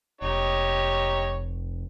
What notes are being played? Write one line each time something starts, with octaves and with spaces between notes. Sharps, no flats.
F1 D#4 G4 C#5